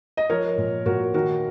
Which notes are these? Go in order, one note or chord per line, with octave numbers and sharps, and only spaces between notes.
D#5
F3 A#4 C#5
A#2
A#2 F#4 A#4
D#3 F#4 A#4